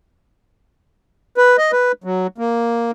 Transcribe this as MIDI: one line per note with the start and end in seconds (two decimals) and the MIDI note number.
1.37 1.57 71
1.58 1.71 75
1.72 1.92 71
2.04 2.27 54
2.38 2.91 58